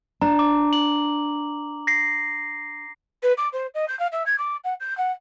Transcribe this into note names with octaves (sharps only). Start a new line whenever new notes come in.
D4 A#5
D6
F#7
A#6 C7
B4
D6
C5
D#5
G6
F5
E5
G#6
D6
F#5
G6
F#5